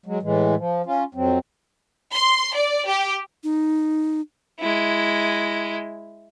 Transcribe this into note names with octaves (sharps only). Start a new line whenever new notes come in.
F#3 G#3
A2 E3 G#3
F3
C#4 F4
F2 F#3 C4
C6
D5
G4
D#4
G#3 E4